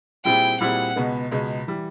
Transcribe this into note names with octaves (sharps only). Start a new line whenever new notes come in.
A#2 G3 C4 E4 G#4 G5
A#2 G3 C4 E4 G#4 F#5
C#2 B2 G#3 B3
C#2 B2 G#3 B3
E3 G3